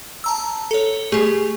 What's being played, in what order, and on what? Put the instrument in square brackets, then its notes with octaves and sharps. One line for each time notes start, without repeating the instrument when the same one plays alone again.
[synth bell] A5 A#5 E6
A4 C#5
[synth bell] A3 G4 [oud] G#4